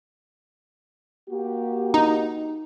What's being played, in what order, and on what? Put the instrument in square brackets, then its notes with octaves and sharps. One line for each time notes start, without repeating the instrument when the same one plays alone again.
[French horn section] A#3 F#4 G4
[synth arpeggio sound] D#4